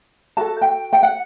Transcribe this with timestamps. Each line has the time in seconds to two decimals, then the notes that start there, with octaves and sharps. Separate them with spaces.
0.37 F#4 A4 A5
0.61 G5
0.93 G5
1.03 F#5